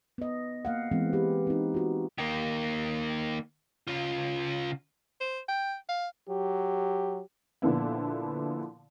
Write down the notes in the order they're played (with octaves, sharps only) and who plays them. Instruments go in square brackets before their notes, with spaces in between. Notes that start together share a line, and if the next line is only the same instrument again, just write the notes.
[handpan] B3 D#5
A#3 F5 F#5
E3 G#3 B3 C4
G4 B4
C4 D#4
F4 F#4
[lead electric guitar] D#3 A#3
C#3 F4
[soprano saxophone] C5
G5
F5
[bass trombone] F#3 [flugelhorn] G4
[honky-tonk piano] A#2 D3 F3 B3 E4